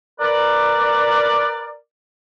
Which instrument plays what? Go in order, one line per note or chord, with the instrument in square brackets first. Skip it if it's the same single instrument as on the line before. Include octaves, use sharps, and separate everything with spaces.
[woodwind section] A#4 B4 D5